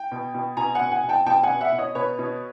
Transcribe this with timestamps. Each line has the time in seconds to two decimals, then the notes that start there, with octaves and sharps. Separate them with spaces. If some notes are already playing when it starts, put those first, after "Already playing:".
Already playing: G5
0.12 B2
0.34 B2
0.57 B2 G#5 A#5
0.75 F#5 G#5
0.81 B2
0.92 F#5 G#5
1.04 B2
1.09 G5 A5
1.26 B2 G5 A5
1.43 F#5 G#5
1.49 B2
1.61 E5 F#5
1.73 B2
1.78 C#5 D#5
1.95 B2 B4 C#5
2.19 B2